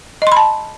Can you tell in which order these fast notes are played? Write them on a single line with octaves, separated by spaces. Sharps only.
D#5 C6 B5 A5